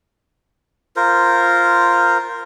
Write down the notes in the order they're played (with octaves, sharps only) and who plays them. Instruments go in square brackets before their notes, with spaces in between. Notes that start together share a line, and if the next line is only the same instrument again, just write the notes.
[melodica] F4 A#4 C5